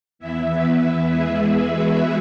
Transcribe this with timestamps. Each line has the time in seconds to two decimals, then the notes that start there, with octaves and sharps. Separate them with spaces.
0.19 E2 E3 B3 E4 E5
0.50 B3 B4
0.80 B3 B4
1.10 G#3 G#4
1.41 B3 B4
1.72 F#4